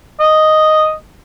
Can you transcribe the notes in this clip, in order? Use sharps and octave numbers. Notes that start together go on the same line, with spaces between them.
D#5